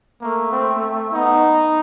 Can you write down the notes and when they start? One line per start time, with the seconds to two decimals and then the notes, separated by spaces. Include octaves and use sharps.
0.21 A3 A#3
0.52 C4
1.13 B3 D#4